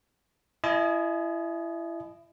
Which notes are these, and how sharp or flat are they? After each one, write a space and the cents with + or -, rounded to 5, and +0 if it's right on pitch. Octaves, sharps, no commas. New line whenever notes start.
E4 +25 D#5 -10 G#5 +40